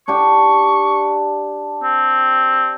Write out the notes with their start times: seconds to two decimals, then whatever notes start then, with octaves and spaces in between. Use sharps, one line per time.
0.08 D4 G4 C#6
1.84 C4